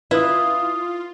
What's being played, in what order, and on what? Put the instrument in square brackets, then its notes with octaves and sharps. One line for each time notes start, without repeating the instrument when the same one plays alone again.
[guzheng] E4 [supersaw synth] F4 [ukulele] B4 [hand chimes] F5 D#6